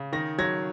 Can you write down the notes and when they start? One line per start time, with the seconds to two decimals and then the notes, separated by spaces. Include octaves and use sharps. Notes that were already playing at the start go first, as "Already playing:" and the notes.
Already playing: C#3
0.13 D#3 A#6
0.38 F#3 G#6 A#6